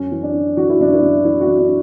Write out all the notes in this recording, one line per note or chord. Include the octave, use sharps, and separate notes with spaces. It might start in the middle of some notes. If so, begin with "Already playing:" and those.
Already playing: F#2 C#4
E3
D4
E3
E3 F#4
E4
F#2 D4
E4
F#2
E3 E4
F#4
E3
D4